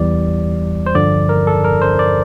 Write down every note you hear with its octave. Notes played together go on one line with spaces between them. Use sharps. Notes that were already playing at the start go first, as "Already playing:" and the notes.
Already playing: E2 E3 G3 D5
C5
G2 D3 F3 D5
A#4
A4
A#4
C5
D5